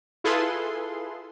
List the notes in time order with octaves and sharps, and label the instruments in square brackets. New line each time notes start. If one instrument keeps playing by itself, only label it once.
[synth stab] E4 F4 G#4 A4 B4 C6